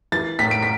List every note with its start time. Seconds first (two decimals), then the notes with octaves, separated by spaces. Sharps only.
0.12 E3 A6
0.39 A2 B6
0.51 D7
0.63 B6